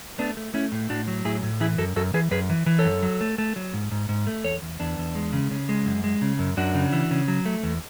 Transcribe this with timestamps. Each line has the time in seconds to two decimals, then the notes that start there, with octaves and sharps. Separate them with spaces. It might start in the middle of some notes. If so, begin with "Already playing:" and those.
0.18 A3 B3 D4
0.37 A3
0.54 A3 C#4 E4
0.72 A2
0.90 A2 D4 F#4
1.08 F#3
1.25 A2 E4 G#4
1.43 A2
1.60 E3 E4 G#4
1.78 F#2 F#4 A4
1.96 F#2 F#4 A4
2.14 E3 G#4 B4
2.31 F#2 G#4 B4
2.50 E3
2.66 E3
2.79 A4 C#5
2.85 F#2
3.03 F#3
3.21 A3
3.38 A3
3.56 F#3
3.73 G#2
3.91 G#2
4.09 G#2
4.27 A3
4.44 E2 A4 C#5
4.62 E2
4.80 E2 B3 D4
4.98 E2
5.15 G#3
5.33 C#3
5.51 C#3
5.69 G#3
5.86 F#2
6.04 G#3
6.22 C#3
6.39 F#2
6.57 F#2 D4 F#4
6.75 C#3
6.92 E3
7.11 C#3
7.28 F#3
7.46 A3
7.63 E2